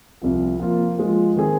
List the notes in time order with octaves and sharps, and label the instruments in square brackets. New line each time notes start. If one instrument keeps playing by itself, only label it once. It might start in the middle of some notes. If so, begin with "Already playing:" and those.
[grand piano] C2 C3 F3
F3 A#3 F4
F3 G#3 F4
D#3 C4 G#4